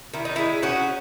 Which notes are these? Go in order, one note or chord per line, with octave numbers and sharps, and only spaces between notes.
D#3 E4
D#4
G#3 E4
C#4 D#4 F#4